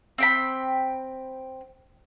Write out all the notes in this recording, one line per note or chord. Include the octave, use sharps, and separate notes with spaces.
C4 G5 B5